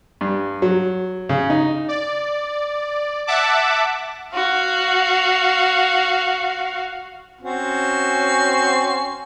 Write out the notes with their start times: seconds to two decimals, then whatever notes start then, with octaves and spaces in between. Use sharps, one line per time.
0.21 G2
0.62 F#3
1.29 C#3
1.50 D#4
1.88 D5
3.27 E5 F#5 A5 D6
4.33 F#4 F5
7.41 C4 C#4 F#4